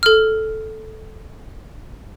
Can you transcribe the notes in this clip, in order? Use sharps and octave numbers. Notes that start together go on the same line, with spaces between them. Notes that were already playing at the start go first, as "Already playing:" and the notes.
A4 F6